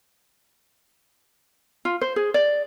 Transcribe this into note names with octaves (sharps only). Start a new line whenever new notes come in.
F4
C5
G#4
D5